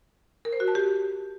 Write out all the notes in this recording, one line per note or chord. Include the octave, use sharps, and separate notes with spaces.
A#4
C5
F#4
A5
G4